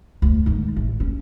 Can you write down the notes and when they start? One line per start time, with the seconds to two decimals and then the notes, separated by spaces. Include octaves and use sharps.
0.22 D2
0.46 G#2 D#3
0.76 A1
1.00 C#4